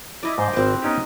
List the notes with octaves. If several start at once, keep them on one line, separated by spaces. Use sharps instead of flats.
E4 D5 D#5
G#2 C5
G#1 C4 B4 G5
B3 C#4 D#4 G4